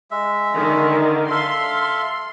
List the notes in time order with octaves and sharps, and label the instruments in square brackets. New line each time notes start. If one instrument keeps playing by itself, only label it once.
[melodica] G#3 E5
[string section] D3 D#3
[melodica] A4 E5 F5 [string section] C6